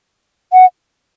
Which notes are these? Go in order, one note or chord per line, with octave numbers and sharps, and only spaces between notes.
F#5